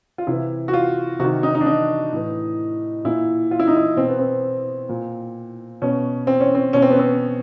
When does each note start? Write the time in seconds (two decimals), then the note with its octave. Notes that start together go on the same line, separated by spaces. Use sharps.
0.18 F4
0.27 C3 E3 E4
0.68 F#4
0.73 F4
1.19 C3 F#4
1.24 D#3
1.43 D#4
1.55 D#4
1.61 D4
1.66 D#4
2.13 A2 E3
3.05 A#2 E4
3.51 F4
3.60 E4
3.67 D#4
3.77 E4
3.96 B2 C4
4.08 B3
4.19 C4
4.89 A#2
5.82 B2 C#4
6.27 C4
6.40 C#4
6.55 C4
6.73 B2 C#4
6.82 C4
6.90 B3
6.99 C4